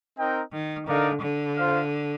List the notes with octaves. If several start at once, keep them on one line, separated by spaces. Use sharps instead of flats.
C4 D#4 A#4 D#5 G5
D#3
D3 D#4 A#4 D5 F5
D3
F4 C5 F5